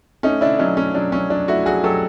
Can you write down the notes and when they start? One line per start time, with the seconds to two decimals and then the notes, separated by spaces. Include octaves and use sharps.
0.23 A3 C#4 D#4
0.41 D3 D4 E4
0.59 F#3 C#4 D#4
0.77 A3 C#4
0.95 F#3 D4
1.12 F#3 C#4
1.30 F#3 D4
1.48 A3 E4 F#4
1.66 F#3 F#4 G#4
1.84 F#3 G4 A4